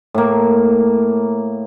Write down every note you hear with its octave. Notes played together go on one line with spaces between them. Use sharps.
A2 A#3